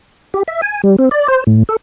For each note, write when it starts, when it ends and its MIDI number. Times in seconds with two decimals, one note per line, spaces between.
0.34 0.43 67
0.48 0.61 76
0.62 0.81 80
0.84 0.96 55
0.99 1.09 60
1.11 1.27 74
1.28 1.44 72
1.47 1.63 45
1.69 1.76 69